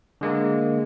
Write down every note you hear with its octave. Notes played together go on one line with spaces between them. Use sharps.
D3 G#3 A#3